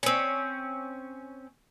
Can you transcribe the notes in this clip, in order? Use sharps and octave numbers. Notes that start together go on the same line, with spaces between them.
C4 C#4